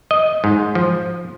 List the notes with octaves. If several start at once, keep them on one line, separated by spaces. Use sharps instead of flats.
D#5
G#2
F3